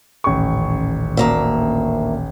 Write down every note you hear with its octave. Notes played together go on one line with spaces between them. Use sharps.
D#1 A1 C#6
D2 A#3 E5